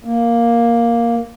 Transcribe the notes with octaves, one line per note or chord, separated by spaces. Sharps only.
A#3